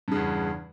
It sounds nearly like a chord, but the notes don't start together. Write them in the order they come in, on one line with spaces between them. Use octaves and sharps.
G2 C#3 E2